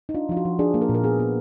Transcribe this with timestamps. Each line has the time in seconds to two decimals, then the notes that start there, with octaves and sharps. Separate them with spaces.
0.09 D#4
0.14 D4 F4
0.29 F3 F4
0.37 F#4
0.45 F3
0.59 D4 G#4
0.74 A#3
0.82 A#4
0.89 A#2
0.95 A#4
1.04 B3 G#4
1.20 B3